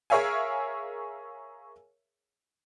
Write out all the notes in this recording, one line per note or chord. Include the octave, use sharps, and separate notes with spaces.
G#4 A#4 C#5 E5 F5 G#5